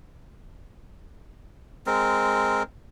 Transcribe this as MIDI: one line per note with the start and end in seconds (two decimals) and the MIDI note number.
1.87 2.63 56
1.87 2.63 60
1.87 2.63 70